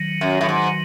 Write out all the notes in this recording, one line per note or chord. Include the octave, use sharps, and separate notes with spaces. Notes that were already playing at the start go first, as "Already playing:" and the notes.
Already playing: D#3 F#3
F#2
A2
G#2